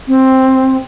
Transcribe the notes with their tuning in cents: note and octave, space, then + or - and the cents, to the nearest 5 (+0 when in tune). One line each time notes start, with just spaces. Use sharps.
C4 +5